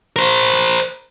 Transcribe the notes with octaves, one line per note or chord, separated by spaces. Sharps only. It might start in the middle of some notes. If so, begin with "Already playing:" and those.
A#4 C5